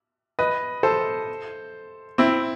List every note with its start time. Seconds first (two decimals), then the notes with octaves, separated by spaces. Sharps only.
0.39 B4 D#5
0.83 A4 C5
2.18 C4 E4